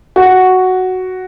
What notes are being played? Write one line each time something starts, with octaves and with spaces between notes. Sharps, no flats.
F#4